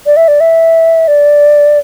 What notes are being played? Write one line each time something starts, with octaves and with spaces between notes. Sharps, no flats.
D5
E5
D5
E5
D5